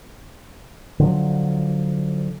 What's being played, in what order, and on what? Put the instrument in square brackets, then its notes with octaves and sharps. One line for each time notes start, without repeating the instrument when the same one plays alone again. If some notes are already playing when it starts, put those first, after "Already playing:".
[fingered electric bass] D3 F3 F#3